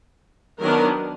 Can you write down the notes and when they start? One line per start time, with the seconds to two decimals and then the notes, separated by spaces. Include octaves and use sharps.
0.60 D#3 F#3 B3 D4 A#4